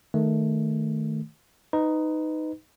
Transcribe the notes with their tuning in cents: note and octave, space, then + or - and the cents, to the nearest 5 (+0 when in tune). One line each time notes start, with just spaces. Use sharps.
D#3 +0 A3 +0
D#4 +0 B4 +25